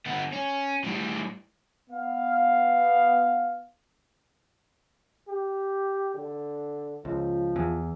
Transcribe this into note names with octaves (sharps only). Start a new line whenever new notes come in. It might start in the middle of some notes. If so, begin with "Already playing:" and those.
D3 B3
C#4
A2 G3
B3 F5
G4
D3
C#2 F3
E2